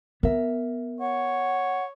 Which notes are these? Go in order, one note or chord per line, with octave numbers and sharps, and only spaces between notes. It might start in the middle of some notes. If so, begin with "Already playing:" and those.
B3 A#4 E5
C#5 F#5